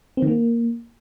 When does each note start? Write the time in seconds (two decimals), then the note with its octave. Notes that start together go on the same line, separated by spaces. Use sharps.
0.17 C4
0.22 D#3
0.27 A#3